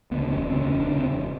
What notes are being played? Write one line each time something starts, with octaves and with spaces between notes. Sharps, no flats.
D2 C#3 B3
E1 C#4
D2 C#3 C4
E1 C#4
D4
D2 C#3 C#4
C4
E1